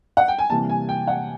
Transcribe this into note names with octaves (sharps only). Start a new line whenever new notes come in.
F#5
G5
G#5
C3 E3 G3 A#3 A5
G#5
G5
F#5